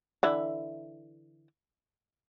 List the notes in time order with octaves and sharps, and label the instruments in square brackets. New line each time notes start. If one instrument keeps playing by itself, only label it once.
[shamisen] D3 E3 E4